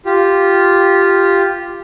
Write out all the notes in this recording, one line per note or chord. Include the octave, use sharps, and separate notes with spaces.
F4 G4